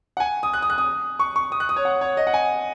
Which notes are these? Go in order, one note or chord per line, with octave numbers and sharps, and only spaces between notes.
F#5
G#5
D#6
F#6
D#6
F#6
D#6
C#6
C#6
D#6
F#6
D#6
C#5
F#5
C#5
D#5
F#5
G#5